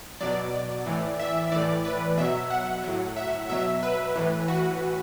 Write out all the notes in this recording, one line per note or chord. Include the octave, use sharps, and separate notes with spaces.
B2 F#3 D5
A2 E3
E5
A2 E3 D5
B4
B2 F#3 E5
F#5
A2 F#3
E5
B2 F#3 E5
B4
A2 E3
F#4